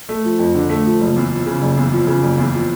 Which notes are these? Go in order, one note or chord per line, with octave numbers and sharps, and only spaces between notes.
A3
F3
F2
D3
A3
F3
F#1
E2
F3
C#3
F#1
E2
F3
C#3
F#1
E2
F3